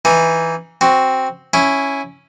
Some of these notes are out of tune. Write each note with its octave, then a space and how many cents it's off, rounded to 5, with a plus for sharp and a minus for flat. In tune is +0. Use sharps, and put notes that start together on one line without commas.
E3 +0 D#4 +15
C4 +0 F#4 +0
C#4 +0 E4 +0